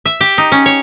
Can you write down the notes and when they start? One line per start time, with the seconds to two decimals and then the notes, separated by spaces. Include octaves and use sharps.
0.06 E5
0.21 G4
0.38 D#4
0.52 C#4
0.66 C#5